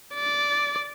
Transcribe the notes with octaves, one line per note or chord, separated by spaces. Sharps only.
D5